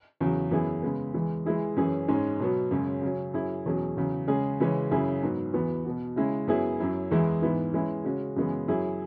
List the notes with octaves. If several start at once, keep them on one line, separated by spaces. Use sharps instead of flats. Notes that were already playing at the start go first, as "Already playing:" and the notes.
E2 C#3 F#3
F#2 E3 B3 E4 G#4
C#3 G#3 B3
E2 E3 G#3
E3 G#3 E4 G#4
F#2 E3 C#4 G#4
G#2 G#3 C#4
B2 F#3 B3
F#2 C#3 G#3 C#4
C#3 F#3 C#4
F#2 F#3 E4 G#4
E2 B2 F#3 C#4 G#4
E2 C#3 F#3
C#3 G#3 C#4 G#4
C#3 E3 G#3 C#4
F#2 C#3 F#3 E4 G#4
G#2 F#3 B3 F#4
E2 E3 B3 F#4
B2 B3 F#4
C#3 G#3 C#4 E4
F#2 F#3 B3 E4 G#4
F#2 F#3 E4
E2 E3 G#3 E4 G#4
G#2 E3 B3 E4
E3 G#3 C#4 E4 G#4
C#3 G#3 C#4 F#4
F#2 C#3 E3 G#3 B3
F#2 F#3 E4 G#4